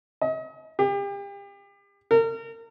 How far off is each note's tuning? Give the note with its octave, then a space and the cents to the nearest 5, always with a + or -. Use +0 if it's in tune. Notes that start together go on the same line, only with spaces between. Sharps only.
D#5 +40
G4 +35
A#4 -35